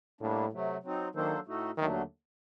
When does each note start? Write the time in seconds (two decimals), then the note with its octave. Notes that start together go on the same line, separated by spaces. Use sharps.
0.21 A2 G3 A#3 D4
0.52 C3 F#3 A3
0.84 F#3 C4 D#4
1.15 D#3 F#3 A#3 D4 A4 C5
1.46 A2 A3 D#4 F#4 A4
1.77 D#2 D3 D#3 F#3 A3 D4